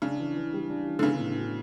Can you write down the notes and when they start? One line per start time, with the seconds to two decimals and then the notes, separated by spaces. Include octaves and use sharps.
0.02 C#3 D4
0.20 E3
0.36 E3
0.53 G3
0.70 D4
0.87 E3
0.99 D3
1.03 C#3 B3
1.20 A2
1.37 F#4